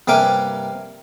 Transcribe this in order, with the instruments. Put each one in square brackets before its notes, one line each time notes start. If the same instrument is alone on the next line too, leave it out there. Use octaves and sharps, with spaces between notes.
[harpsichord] G2 C3 A#3 G#5 D6